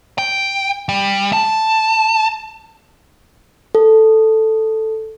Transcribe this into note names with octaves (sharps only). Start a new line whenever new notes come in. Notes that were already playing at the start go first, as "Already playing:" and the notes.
G5
G3
A5
A4